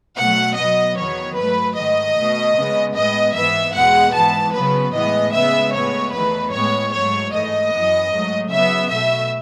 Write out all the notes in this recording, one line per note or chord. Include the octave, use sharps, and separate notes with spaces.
B2 F#3 A3 F#5
B2 F#3 B3 D#5
E2 D#3 F#3 B3 C#5
G#2 F#3 A3 B4
G#2 D#3 A3 D#5
B2 A3
C#3 G#3 B3
A2 G#3 B3 D#5
G#2 E3 B3 E5
E2 B2 G#3 F#5
G#2 E3 B3 A5
C#3 F#3 B3 B4
A2 E3 G#3 B3 D#5
C#3 G#3 B3 E5
A2 G#3 B3 C#5
E2 D#3 A3 B4
A2 G#3 B3 C#5
G#2 F#3 A3 C#5
G#2 E3 A3 D#5
F#2 E3 B3
G#2 F#3 A3
C#3 F#3 B3 E5
B2 A3 E5